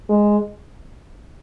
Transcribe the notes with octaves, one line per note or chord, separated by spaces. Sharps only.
G#3